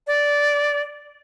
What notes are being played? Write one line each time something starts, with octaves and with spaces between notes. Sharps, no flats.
D5